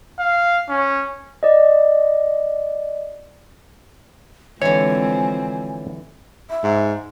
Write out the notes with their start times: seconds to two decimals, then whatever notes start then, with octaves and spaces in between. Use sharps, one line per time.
0.19 F5
0.69 C#4
1.43 D5 D#5
4.62 D3 E3 F3 G#3 C4 C#5 G#5
6.50 E5
6.63 G#2